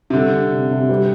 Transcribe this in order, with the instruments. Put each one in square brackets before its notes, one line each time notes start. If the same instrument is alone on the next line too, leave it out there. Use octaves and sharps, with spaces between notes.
[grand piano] C3
[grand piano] D3 [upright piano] G3
[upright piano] D4
C3
C3
G3